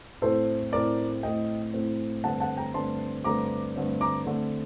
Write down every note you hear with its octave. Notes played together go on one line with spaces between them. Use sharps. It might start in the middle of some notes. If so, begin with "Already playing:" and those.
A2 A3 C4 A4 C5
A2 A3 C4 A#4 D5
A2 A3 C4 D#5 G5
A2 A3 C4
G2 D3 A3 C4 F#5 A5
F#5 A5
G5 A#5
G2 D3 A3 C4 A5 C6
G2 D3 A3 C4 A#5 D6
G2 D3 A3 C4
A#5 D6
D3 A3 C4